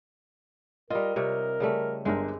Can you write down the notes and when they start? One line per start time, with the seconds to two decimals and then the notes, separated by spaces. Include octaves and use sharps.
0.90 G3 F4 A#4 D#5
1.16 C3 G3 A#4 C#5
1.60 C#3 G3 A3
2.05 G1 G#3 C4 D4 G4 A#4